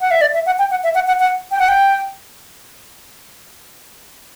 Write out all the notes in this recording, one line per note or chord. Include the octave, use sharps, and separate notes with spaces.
F#5
E5
D5
E5
F#5
G5
F#5
E5
F#5
F#5
F#5
G5
F#5
G5